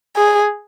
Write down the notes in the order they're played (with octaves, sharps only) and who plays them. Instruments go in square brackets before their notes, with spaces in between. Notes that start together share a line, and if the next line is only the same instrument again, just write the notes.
[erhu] G#4